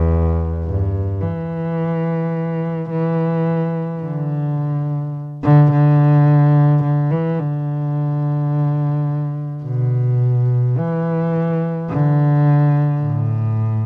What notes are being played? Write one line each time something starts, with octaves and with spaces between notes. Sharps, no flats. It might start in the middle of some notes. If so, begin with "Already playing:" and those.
Already playing: E2
G2
E3
E3
D3
D3
D3
D3
E3
D3
B2
E3
D3
A2